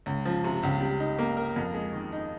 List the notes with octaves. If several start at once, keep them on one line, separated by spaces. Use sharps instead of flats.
C#2
F3
C3
C#2
G3
D#4
A#3
A#4
F2
G#3
D#3
D#4